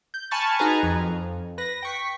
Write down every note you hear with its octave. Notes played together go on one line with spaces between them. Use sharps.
G6
G#5 A5 B5 C#6 F6 A6
D#4 F#4 G#4 B4 G#5 A#5
F2
B4 A#6
G5 C#6 B6